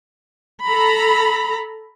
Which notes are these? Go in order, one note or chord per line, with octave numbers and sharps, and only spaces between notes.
A4 A#5 B5